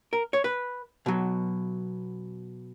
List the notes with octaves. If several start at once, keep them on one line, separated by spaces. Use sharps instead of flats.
A#4
C#5
B4
B2 F#3